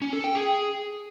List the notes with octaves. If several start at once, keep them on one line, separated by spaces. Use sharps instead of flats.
C#4
A4
G5
G#4